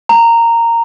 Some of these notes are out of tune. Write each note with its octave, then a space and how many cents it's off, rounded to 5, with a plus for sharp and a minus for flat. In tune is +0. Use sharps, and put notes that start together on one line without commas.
A#5 -10